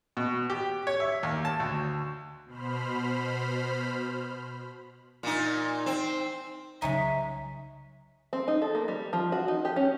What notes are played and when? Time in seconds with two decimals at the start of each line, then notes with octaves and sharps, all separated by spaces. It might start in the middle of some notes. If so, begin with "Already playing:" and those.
0.17 B2
0.50 G4
0.87 C#5
1.00 E5
1.23 D#2
1.45 A5
1.60 D2
2.46 B2 C5 B5 F6
5.23 A#2 D#4
5.86 C4
6.82 C2 C#3 F#3 G#3 C#4 D#4 E5
8.33 C4
8.48 D#4
8.62 A4
8.75 A#3
8.88 G3
9.13 F3
9.32 F#4
9.48 D#4
9.65 G4
9.76 C#4